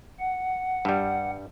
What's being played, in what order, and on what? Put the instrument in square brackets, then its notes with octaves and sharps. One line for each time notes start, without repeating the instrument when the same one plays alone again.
[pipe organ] F#5
[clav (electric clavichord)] G2 G3